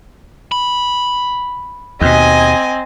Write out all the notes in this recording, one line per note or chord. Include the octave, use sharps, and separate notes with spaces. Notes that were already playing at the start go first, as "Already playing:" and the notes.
B5
D#2 B2 C4 D#5 G#5